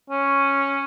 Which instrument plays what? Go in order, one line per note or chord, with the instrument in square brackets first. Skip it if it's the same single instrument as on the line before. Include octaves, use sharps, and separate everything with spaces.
[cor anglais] C#4